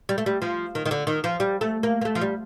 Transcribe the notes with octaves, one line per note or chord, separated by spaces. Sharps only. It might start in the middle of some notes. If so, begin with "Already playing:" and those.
G3
A3
G3
F3
D#3
D#3
D3
D#3
F3
G3
A3
A#3
A#3
A3
F3
G3